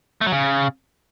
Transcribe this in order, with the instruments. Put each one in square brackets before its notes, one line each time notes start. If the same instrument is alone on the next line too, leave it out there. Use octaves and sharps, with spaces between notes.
[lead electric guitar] A3
F#3
C#3